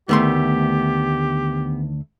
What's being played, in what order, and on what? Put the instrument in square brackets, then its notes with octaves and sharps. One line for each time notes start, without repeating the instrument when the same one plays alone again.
[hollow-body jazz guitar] D2 A3 C6 [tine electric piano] D#3 [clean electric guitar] B3 [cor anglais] G4